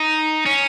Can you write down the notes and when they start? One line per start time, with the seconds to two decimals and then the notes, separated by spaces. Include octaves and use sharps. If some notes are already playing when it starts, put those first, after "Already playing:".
Already playing: D#4
0.46 C#4